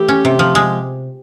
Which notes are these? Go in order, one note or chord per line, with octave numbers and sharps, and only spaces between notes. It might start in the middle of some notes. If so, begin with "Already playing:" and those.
Already playing: E3 A3 G4
C#4
C3
F3
G#3